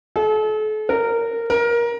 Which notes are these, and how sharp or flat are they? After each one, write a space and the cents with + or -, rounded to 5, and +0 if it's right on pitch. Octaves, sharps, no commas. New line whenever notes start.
A4 -40
A#4 -15
A#4 +20